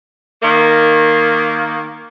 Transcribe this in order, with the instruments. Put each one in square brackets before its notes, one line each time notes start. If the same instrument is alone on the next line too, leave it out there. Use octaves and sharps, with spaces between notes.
[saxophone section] D#3 A#3